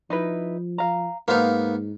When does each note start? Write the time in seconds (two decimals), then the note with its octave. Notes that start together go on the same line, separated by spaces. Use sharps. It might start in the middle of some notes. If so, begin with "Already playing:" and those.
0.10 F3 D#4 E4 B4
0.78 F5 A#5
1.28 G#2 A#3 B3 D#4 C5 F5